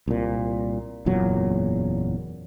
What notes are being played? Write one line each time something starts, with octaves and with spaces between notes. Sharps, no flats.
C2 A#2
F#1 E2 A#2 F#3